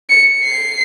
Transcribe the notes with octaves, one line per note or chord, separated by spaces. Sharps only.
C#7
C7